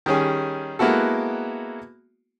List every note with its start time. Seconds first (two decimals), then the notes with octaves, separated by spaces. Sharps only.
0.06 D#3 G3 C#4 G#4
0.79 G#3 A#3 B3 E4 F#4 A4